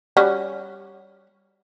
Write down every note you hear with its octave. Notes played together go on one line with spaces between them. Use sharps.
G3 C#4 F#4